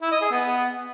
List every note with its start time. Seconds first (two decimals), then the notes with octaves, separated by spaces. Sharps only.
0.02 E4
0.12 D#5
0.21 G#4
0.31 B3